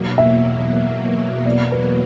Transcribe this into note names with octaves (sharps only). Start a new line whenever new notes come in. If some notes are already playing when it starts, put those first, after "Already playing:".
Already playing: E2 B2 F#3 A#3
E5
D5
B4